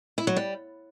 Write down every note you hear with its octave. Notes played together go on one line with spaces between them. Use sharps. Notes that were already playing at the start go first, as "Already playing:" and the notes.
E4
F#3
G3